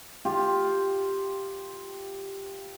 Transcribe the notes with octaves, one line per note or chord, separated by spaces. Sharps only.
F4 G4